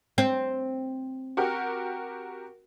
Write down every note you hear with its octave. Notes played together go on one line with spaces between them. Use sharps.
C4
F#4 G4 A#4